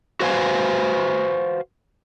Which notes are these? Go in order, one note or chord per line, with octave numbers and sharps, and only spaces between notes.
F#4 B4 C5 F5 G#5